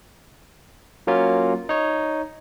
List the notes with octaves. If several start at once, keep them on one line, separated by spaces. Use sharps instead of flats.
F#3 A#3 C#4 F4
D#4 C#5